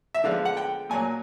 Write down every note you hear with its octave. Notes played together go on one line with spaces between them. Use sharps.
E5
D3 F3 G#3 B3 D4 F5
F#5
G5
A#2 F#3 A#3 G#5